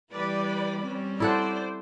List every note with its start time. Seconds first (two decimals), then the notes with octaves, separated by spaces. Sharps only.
0.12 E3 G3 G4 B4 D5 B5
0.80 G3 C4 C#4
1.20 E4 A4 C5 D5 F#5